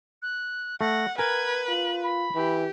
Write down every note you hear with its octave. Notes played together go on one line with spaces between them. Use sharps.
F#6
A3 F#5 A#6
A#4 B4 G#5 G#6
F4 F#7
B5
E3 G4